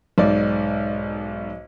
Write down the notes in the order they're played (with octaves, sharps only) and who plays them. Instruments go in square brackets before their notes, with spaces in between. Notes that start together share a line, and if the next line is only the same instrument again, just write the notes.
[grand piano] B1 G#2 D5